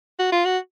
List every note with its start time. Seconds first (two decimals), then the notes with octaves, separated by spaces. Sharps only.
0.20 F#4
0.32 F4
0.46 F#4